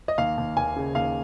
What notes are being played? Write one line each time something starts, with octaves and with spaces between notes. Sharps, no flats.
D#5
D#2 F5
D#2
D#2 G#5
C#3
D#2 F5